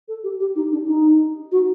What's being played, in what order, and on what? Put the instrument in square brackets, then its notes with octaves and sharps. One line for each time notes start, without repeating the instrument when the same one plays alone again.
[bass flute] A4
G4
G4
D#4
D4
D#4
F#4